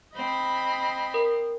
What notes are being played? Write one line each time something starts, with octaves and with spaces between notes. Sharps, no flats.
C4 D#5 B5
A#4